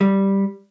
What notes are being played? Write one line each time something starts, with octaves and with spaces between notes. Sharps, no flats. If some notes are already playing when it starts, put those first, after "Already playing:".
G3